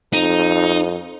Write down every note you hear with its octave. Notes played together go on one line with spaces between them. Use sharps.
F2 D#4